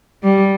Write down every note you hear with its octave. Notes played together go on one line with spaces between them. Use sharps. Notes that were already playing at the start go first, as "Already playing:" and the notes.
G3